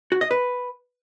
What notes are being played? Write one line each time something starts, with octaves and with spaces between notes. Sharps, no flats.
F#4
D#5
B4